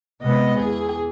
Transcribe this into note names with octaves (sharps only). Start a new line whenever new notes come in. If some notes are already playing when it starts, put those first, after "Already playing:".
C3 G#3 B3 D#5
E2 G#4